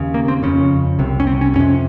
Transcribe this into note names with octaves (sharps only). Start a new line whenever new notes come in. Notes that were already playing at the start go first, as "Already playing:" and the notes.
Already playing: D#2 C#3
A#3
C4
F2 C#3 C#4
C2 C3
C#4
C4
C#4
F2 C3 C#4